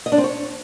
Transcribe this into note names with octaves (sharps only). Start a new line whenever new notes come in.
D#5
D4
C4
C#5